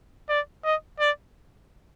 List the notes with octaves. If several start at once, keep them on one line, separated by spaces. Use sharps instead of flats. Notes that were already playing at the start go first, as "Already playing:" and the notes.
D5
D#5
D5